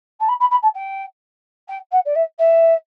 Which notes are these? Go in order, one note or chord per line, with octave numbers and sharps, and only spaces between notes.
A5
B5
B5
B5
A5
G5
G5
F#5
D5
E5
E5